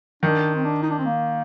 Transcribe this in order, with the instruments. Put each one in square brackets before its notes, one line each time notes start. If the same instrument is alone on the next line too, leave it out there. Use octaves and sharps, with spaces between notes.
[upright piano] D#3 [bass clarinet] D4
[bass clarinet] C4
D4
D#4
D4
C4
A#3